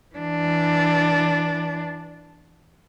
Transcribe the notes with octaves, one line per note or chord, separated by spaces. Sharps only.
E3 D4